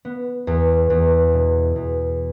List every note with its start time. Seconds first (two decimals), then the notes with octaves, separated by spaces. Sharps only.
0.05 B3
0.47 E2
0.90 E2
1.33 B2
1.76 E2